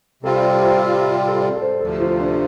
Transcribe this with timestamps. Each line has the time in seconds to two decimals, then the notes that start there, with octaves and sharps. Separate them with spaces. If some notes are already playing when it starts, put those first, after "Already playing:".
0.23 C3 G3 C4 F4 A4
0.50 D5
0.62 C5
1.16 D5
1.28 A4
1.41 D5
1.56 A4
1.62 C5
1.81 D2 C3 F3 A4
2.00 F4
2.20 D4